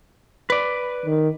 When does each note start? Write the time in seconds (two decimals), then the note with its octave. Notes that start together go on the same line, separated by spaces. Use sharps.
0.50 B4 D5
1.06 D#3